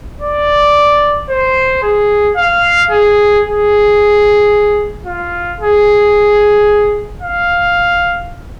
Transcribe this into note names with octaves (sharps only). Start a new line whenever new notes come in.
D5
C5
G#4
F5
G#4
G#4
F4
G#4
F5